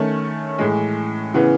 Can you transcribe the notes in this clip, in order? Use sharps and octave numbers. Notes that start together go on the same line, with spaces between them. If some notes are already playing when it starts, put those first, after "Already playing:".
Already playing: D#3 A3 C#4
A2 E3 G#3
C#3 E3 B3